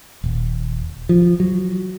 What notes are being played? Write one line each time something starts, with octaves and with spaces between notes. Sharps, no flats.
D#1
F3
F#3